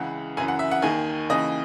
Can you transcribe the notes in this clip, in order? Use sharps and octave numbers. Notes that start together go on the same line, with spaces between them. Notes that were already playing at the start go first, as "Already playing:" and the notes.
Already playing: C#2 C#3 E3 F#5
F#2 C#3 E3 G#5
F#5
E5
F#5
D#2 D#3 G#5
D#2 C#3 E3 D#5